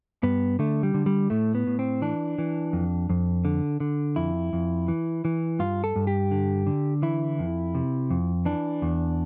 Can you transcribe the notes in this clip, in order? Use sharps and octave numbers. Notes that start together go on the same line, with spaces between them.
G2 B3
D3 A3
G3
D3
G3
A2 A3
B3
A2
C4
E3 D4
E3
F2
F2
D3
D3
F2 E4
F2
E3
E3
G2 F4
A4
G2
G4
D3
D3
E3 E4
F2
C3
F2
E3 D4
E2